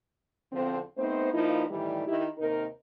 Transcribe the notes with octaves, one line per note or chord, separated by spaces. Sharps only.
E2 D3 F3 C4
A3 B3 C4 D#4 C5
G2 F3 A#3 D#4 E4
A2 D#3 E3 G3
D#3 E4 G4
D#2 C3 D#4 A#4